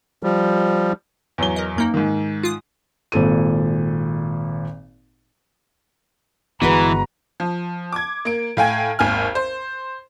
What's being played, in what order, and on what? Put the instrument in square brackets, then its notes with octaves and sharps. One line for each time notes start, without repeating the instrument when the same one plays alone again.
[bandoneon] F3 G3
[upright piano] E2 F#3 G7
[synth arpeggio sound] A#4 D#5
F#2 A#3 D#4
[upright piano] G#2 D#3
[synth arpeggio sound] F4 D#6
[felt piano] G#1 A#2 A4 D#7
[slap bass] G1 B3 [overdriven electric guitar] E3 [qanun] G#3 F#4 B4 [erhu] A#5
[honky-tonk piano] F3
D6 G#6
A#3 D7
A2 F5 G5 G#5 G#6
G#1 D#2 G#5 F6
C5